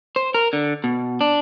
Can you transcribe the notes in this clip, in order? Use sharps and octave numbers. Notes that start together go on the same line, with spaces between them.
C5
A#4
D3
B2
D4